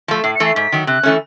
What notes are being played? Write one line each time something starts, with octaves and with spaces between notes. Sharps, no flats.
F3 A3
A2 C7
C#7
E3 A3
C7
G#2 B6
D#3 F#3
C3 F#6
E3 A3 C#4